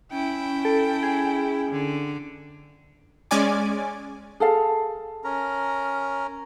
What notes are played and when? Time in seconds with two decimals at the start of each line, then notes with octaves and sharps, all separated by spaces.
0.12 C#4 E4 G5
0.65 A4
1.03 G#4
1.71 D3
3.31 G#3 C#4 D5 G#5 D6
4.40 G#4 A4 F5
5.24 C#4 A#4 A#5